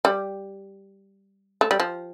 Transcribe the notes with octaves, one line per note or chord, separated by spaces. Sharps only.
G3
A3
G3
F3